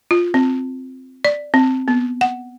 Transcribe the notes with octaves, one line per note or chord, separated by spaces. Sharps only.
F4
C4
D5
C4
B3
F#5